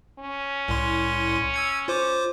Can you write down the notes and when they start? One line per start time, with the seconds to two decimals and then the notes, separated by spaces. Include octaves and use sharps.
0.19 C#4
0.68 C2 A2 C6
1.54 E6 G#6 C#7
1.88 F4 C5 D6